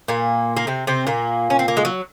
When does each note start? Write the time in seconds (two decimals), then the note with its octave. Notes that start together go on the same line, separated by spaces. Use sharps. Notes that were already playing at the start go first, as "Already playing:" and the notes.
0.08 A#2 A#3
0.57 A#3
0.67 C3 C4
0.87 C3 C4
1.07 A#2 A#3
1.50 C#4
1.59 C4
1.68 A#3
1.77 G#3
1.85 F#3